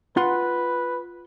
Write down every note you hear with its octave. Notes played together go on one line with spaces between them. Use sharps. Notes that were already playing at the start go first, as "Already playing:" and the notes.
F4 B4 F#5 C6